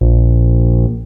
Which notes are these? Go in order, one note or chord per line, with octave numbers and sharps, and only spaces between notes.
A#1